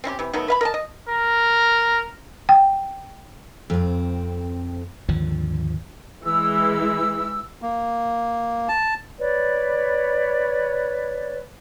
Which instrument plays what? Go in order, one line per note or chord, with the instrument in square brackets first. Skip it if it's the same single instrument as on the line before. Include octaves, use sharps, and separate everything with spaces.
[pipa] C4 C#4 E4 G4
C3 E3
D#3 F#3 A3 B3
B4 F5 B5
A#4 D#5 A5
D#5
[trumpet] A#4
[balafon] G5
[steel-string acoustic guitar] F2 C4
[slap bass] G#1 D#2 D3 F3
[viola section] E3 G#3 E4 [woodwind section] E6
[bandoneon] A#3
A5
[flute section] B4 C#5 D5